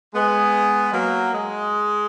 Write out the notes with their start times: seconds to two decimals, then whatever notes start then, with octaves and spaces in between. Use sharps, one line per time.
0.14 G#3 B3
0.93 F#3 A#3
1.33 G#3